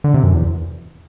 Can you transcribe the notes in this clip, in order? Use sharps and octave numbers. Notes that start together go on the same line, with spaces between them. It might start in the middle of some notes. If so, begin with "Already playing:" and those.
D3
C3
F#2
E2